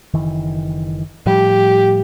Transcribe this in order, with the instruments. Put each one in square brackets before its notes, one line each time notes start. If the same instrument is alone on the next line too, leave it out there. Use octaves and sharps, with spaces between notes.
[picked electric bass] F#1 D#3 E3
[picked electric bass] A2 F3 G3 [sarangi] G4